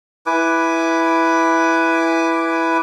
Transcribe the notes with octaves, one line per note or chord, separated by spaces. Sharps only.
E4 B4 G#5 D6